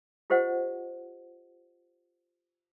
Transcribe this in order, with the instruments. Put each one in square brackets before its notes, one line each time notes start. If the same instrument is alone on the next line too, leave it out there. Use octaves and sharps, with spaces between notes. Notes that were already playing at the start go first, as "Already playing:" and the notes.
[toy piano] F4 G4 C5 D#5 F#5